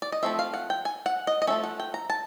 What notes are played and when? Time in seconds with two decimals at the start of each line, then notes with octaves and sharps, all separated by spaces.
0.02 D5
0.12 D#5
0.23 F3 A3 C4 E5
0.39 F5
0.54 F#5
0.70 G5
0.85 G#5
1.06 F#5
1.27 D#5
1.42 D#5
1.47 F3 A3 C#4 E5
1.64 F#5
1.80 G5
1.94 A#5
2.10 A5